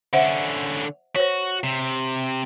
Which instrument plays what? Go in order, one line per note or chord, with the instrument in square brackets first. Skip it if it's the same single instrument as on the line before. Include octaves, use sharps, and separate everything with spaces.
[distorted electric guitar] D3 C#4 [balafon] C5 E5 F#5
[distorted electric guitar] F#4 [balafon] C5 C#5
[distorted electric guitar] C3